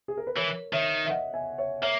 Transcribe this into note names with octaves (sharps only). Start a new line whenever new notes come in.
G#4
A#4
B4
E3 A#4 C#5
D#3 C#5 E5
E5
D#5 F#5
E5 G#5
C#5 E5
A#3 C#5 E5